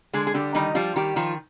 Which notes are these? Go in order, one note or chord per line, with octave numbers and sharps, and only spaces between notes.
D3 G#3 G#4
G#4
D3 G3 G4
D#3 G3 D#4
F3 G3 F4
D#3 G3 G4
D#3 F3 F4